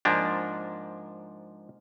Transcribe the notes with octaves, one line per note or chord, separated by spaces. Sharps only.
G#2 F3 A#3 D4